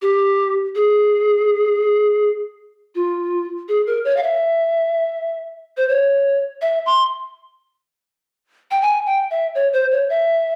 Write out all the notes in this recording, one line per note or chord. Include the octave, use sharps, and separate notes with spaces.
G4
G#4
F4
G#4
A#4
C#5
F5
E5
C5
C#5
E5
C6
G5
G#5
G5
E5
C#5
C5
C#5
E5